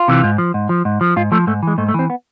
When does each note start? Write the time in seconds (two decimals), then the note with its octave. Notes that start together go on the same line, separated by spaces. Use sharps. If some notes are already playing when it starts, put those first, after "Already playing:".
Already playing: F4
0.08 C3 E3
0.24 G#2
0.38 F3
0.54 G#2
0.69 F3
0.85 G#2
1.01 F3
1.17 G#2 F4
1.32 F3 A3
1.47 G#2 A3
1.63 E3 G#3
1.78 G#2 A3
1.89 A3
1.94 E3 C4
2.10 B3